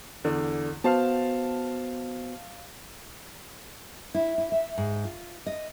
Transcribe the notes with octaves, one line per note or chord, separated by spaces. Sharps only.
E2 D3
B3 F#4 C5 F5 A5
E4
E4
E5
G#2
F4
D#5